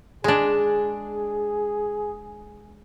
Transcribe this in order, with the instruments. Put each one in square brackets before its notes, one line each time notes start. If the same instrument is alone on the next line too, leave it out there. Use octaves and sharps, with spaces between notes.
[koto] G#3 D4 [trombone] G#4